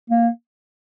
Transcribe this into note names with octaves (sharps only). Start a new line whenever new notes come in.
A#3